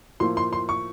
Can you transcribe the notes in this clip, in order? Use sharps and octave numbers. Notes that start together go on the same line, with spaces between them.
A2 F3 A#3 C6
C6
C6
C#6